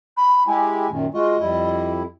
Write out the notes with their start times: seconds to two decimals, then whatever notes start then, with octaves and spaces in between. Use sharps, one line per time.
0.17 B5
0.47 G#3 E4 G4 G#5
0.90 F#2 A#2 D#3
1.14 G#3 F4 F#4 D#5
1.40 F2 G3 E4